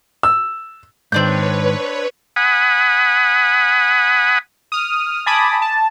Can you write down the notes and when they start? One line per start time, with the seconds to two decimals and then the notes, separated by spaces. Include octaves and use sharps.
0.23 E6
1.12 G#2 D#3 C4 D4 B4 C#5 G6
2.36 F#5 G#5 B5 D#6
4.72 D#6 F6
5.26 G#5 A5 B5 D6 D#6
5.62 A5